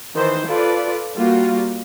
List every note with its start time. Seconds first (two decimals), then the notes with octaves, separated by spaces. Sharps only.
0.15 D#3 E3 C5
0.47 F4 A4 B4 D5
1.16 G3 A#3 F4 F#4